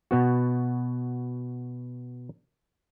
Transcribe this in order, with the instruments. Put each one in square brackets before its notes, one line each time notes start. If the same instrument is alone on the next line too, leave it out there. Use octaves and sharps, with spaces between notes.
[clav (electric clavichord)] B2 B3 F#4